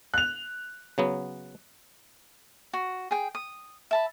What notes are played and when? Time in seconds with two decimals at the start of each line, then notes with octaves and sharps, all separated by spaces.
0.14 F#6 F7
0.98 C#3 F#3 B3
2.74 F#4
3.11 G#4 G5
3.35 D#6
3.91 E5 A5 B5